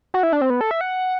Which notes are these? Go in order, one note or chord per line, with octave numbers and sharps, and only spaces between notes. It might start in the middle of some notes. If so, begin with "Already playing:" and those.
F#4
E4
D4
C4
B3
A4
E5
F#5